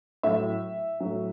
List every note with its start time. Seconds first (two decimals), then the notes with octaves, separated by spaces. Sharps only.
0.23 A2 F#3 E5
1.00 A2 F#3